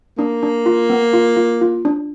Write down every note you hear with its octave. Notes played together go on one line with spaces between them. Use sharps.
A#3 D4
D4
F4
B3
F4
F4
F4
D4